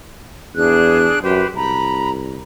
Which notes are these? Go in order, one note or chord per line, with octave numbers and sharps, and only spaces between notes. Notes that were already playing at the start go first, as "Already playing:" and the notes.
E2 D4 G#4 F#6
F#2 G4 B4 C5
C2 A#5 B5